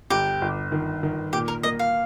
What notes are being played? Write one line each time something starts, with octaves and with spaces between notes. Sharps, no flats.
G1 G4
G1
D#3
D#3
A#2 G4
A#4
A#3 D#5
F5